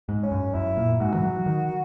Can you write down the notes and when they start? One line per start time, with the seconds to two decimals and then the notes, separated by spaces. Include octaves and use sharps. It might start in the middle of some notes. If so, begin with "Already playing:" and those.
0.09 G#2
0.23 C#4
0.32 F#2
0.54 F#2 E4
0.77 A#2
1.00 G#2 F#4
1.14 E3
1.23 F#3
1.46 D#3